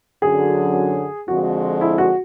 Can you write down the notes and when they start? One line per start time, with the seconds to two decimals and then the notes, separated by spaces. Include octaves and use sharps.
0.22 F#2 D3 F#3 G#4
1.28 F2 D3 F3 G#3 F#4
1.81 E4
1.98 F#4